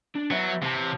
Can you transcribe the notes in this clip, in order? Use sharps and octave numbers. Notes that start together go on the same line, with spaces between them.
D4
F#3 B3 E5
C3 E3 A5